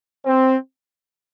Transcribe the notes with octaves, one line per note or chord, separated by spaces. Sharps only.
C4